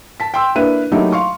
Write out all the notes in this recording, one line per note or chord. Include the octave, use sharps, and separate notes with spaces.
A5 B6
G5 C6 E6
A#3 D4 E4 B4 D#7
F#3 A3 A#3 D#4 E4 G4
F5 C6 C#6